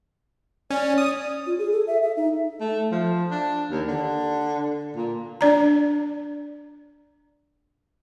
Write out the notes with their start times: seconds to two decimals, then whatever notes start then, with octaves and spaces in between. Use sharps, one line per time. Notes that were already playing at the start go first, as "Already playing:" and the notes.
0.71 C#4 D5
0.98 D#6
1.47 F4
1.59 G#4
1.72 A4
1.87 E5
2.03 E5
2.17 D#4
2.61 A3
2.92 F3
3.31 D4
3.71 D#2
3.88 D3
4.96 A#2
5.41 D4 D5 A#5